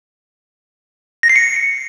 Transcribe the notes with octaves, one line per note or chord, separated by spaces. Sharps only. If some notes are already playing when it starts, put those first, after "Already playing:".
A#6
C7
C#7